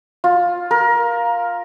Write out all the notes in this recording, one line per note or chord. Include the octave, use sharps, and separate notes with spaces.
F4
A#4